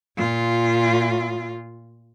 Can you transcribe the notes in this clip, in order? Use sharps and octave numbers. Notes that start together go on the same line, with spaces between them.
A#2 F4